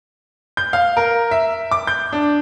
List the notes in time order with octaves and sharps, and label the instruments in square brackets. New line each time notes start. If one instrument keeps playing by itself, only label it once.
[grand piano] G6
F5
A#4
E5
D6
G6
D4